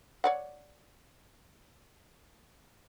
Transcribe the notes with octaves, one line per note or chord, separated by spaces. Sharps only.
C#5 D5 F#5